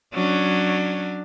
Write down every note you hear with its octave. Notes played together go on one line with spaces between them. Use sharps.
F#3 C#4 D4